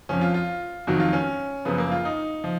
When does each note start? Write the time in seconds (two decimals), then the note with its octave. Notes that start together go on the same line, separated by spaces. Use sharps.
0.09 F2 F3 C#4
0.21 F4
0.34 F4
0.87 F2 D#3 F#3 F#4
1.00 F4
1.13 C#4
1.65 F#2 C#3 F3 B3
1.78 A#3
1.92 F4
2.05 D#4
2.44 F3